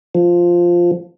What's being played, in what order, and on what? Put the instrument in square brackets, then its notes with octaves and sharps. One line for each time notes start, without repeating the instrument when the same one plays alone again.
[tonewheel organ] F3